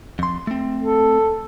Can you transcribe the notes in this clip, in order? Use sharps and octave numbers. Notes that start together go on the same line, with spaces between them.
F2 C6
A3 C4
A4